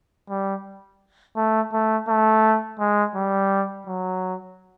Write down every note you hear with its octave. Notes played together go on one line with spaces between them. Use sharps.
G3
A3
A3
A3
G#3
G3
F#3